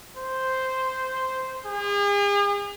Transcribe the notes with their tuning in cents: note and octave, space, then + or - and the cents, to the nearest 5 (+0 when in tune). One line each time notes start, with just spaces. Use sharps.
C5 -5
G#4 -40